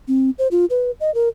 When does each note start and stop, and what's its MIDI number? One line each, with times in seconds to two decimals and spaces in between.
0.08 0.30 60
0.39 0.48 72
0.51 0.65 65
0.70 0.91 71
1.00 1.13 75
1.14 1.29 70